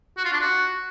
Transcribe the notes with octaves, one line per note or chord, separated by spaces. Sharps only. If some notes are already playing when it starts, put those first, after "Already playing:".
F#4
F4
D4
F#4